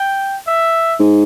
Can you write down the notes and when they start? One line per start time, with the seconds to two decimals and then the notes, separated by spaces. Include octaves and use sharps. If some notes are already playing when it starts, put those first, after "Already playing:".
Already playing: G5
0.47 E5
1.00 G#2